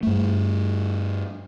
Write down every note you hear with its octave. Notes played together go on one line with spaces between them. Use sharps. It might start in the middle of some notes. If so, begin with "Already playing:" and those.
G2 A3